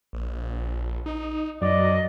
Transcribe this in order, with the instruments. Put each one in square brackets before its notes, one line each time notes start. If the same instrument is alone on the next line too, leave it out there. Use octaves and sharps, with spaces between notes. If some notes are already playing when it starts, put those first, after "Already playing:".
[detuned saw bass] A#1
D#4
[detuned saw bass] F#2 [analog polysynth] F#3 [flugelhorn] D5 [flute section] D#5